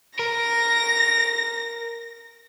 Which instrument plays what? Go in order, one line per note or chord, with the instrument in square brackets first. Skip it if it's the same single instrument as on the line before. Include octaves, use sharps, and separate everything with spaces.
[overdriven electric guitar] A#4 [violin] A#6